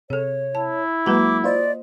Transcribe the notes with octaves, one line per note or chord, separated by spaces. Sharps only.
C3 G#4 A4 C#5
E4 A5
F#3 G#3 A#3 F#4 B4 A#5 D6
F4 C5 D5 D#5